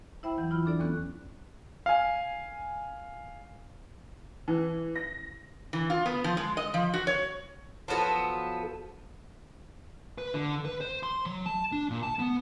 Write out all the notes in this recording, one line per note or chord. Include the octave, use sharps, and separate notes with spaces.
E4 C5 E5 G5 B5
E2 E3 F#3
E3 E4 F4 B5 F6
D4 A4 D5
E2 B3 C#4 F#6
F5 G#5
E3
A#6
E3
F4
B3
F3
G#3
D#5
F3
F#4
C#5
F3 F#3 B3 A4
B4
D3
B4
C5
C6
F#3
A5
D4
A#2
A5
B3